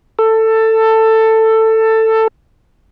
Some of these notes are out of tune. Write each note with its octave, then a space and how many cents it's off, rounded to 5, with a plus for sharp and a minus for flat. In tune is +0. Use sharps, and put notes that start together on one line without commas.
A4 +15